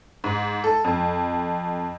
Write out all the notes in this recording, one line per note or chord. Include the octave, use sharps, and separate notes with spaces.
G#2
A4
F2